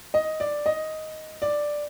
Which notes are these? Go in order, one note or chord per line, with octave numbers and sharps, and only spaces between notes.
D#5
D5
D#5
D5